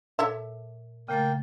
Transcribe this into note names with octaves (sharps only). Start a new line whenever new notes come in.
A#2 A4 C#5 E5
C#3 A3 A#3 G5 A6